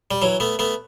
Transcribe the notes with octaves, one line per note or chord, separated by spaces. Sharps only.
G3
E3 F#3
A3 B3
A3 B3